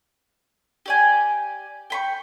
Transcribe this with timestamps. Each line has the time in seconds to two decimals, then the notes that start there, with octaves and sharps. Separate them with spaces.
0.86 G4 D5 G#5
1.90 G5 B5 C#6